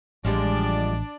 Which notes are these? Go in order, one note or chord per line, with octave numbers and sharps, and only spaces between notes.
A1 F3 G3 G#3 D4 D5